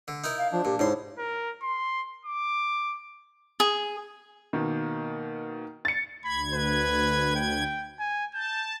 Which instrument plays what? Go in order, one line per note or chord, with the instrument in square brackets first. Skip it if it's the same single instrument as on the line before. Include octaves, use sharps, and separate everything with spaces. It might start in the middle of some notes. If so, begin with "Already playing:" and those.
[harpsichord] D3
D#4 E4 A#4
[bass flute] F5
[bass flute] F3 [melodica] D4
[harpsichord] A#2 [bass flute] G4
[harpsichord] G#2 C6 [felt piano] D#4 C5 C#5 [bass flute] E4
[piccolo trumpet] A#4
C6
D6
[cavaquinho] G#4
[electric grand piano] B2 A#3 [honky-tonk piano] D#3
[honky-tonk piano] A6 C#7
[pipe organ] D2 G#6 [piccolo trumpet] B5
[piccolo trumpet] B4
G5
G#5
[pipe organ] A5 [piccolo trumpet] G6